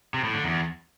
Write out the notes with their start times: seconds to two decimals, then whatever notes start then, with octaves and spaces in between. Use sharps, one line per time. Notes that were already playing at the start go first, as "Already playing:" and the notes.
0.14 C3
0.24 A2
0.34 D3
0.44 E2